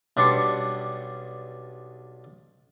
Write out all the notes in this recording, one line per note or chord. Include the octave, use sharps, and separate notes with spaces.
B1 G3 D4 C6 C#6